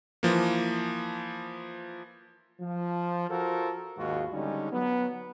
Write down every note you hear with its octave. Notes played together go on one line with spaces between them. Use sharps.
E3 F3 A#3
F3
F4 F#4 A4 A#4 C5
D#2 G#2 D#3 F4 F#4
D3 G3 G#3 C#4 D#4
F#3 B3